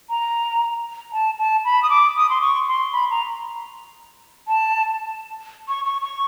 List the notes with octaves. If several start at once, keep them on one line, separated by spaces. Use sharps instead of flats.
A#5
A5
A5
B5
D#6
D6
D#6
C6
C#6
C6
B5
A#5
A5
C#6
C#6
C#6